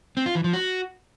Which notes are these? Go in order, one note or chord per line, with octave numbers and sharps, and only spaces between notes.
C4
F4
E3
F3
F#4